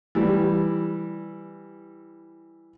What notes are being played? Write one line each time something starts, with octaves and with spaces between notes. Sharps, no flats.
E3 G3